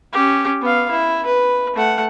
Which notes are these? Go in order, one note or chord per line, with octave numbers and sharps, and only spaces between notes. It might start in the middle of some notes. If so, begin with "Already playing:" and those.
C#4 G4
B3 F5
E4
B4
A3 F#5